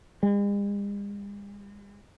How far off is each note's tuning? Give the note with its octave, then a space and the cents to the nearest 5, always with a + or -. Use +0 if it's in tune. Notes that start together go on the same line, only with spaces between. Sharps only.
G#3 -45